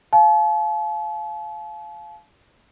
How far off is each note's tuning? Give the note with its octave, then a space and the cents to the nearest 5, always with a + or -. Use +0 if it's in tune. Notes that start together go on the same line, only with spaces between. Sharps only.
F5 +0 A5 -40